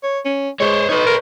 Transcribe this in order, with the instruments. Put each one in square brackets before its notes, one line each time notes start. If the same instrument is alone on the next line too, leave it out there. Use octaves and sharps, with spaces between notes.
[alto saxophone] C#5
C#4
[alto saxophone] G#3 [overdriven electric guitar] C5 C#5
[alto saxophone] D#4 [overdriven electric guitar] B4 C#5
[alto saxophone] A#4